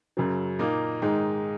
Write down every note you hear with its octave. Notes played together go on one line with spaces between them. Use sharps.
F#2 C#3 F#3
A#2 A#3 D#4
G#2 D#3 G#3 D#4